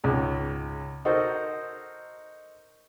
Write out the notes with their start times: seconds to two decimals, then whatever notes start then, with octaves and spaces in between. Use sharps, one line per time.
0.04 C#2 G#2
1.05 D#4 F#4 A4 A#4 C5